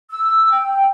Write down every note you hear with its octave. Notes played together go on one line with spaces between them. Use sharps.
E6
G5